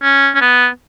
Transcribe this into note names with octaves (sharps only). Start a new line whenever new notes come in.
C#4
C#4
B3